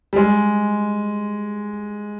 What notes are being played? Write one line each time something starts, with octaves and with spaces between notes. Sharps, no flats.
G3
G#3